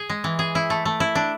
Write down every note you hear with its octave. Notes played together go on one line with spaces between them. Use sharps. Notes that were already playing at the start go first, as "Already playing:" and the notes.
Already playing: G#4
G#3
E3
G#4
E4
A3
A3
E4
D4